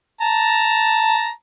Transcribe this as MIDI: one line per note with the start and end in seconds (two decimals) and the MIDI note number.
0.21 1.30 81
0.21 1.30 82